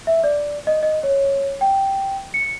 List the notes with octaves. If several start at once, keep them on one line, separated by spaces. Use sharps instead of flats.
E5
D5
D#5
D#5
C#5
G5
C#7